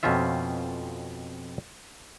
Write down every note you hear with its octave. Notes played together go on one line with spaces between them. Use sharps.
F2 B2 C4 C#4 F4 E5